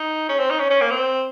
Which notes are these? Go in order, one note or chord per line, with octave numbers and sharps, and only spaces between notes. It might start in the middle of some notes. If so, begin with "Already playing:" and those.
Already playing: D#4
C#4
C4
D#4
C#4
C#4
A#3
C4